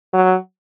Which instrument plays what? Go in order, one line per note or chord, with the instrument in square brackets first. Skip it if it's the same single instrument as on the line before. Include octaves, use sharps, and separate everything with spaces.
[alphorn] F#3